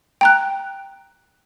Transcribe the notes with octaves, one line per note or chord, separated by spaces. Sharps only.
G5 A#5 F#6